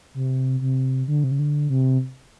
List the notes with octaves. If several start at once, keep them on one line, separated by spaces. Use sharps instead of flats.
C3
C3
D3
C3
C#3
D3
C3